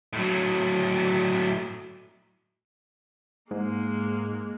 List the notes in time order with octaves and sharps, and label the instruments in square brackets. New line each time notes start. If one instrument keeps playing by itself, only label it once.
[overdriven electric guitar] A2 F#3
[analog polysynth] G#2 [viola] G#3 A#3